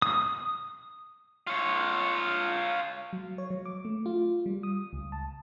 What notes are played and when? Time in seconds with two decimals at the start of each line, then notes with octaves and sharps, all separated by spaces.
0.02 D#6
1.47 F4 C#5
3.13 F#3
3.38 C#5
3.50 F#3
3.65 D6
3.85 A3
4.06 F4
4.46 G3
4.63 D#6
4.93 C#2
5.12 A5